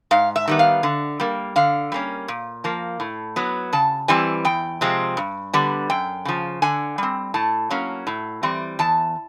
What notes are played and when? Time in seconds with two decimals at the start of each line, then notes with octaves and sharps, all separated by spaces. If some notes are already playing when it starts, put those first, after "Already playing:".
0.11 G#2 F5
0.36 E5
0.48 D#3 G3 B3
0.59 F5
0.83 D3
1.20 G3 A#3
1.56 D3 F5
1.92 G3 A#3 C#4
2.28 A#2
2.64 F3 A#3
3.00 A2
3.36 F#3 B3
3.73 C#3 A5
4.08 E3 G3 C4 G#5
4.45 E2 G5
4.81 C3 F3 G#3 C4
5.17 G2
5.53 D3 G3 B3
5.90 F#2 G5
6.25 C#3 F3
6.62 D3 G#5
6.98 G3 C4
7.34 A2 A5
7.70 F#3 A#3 C#4
8.07 A2
8.43 E3 G3 C4
8.79 E2 A5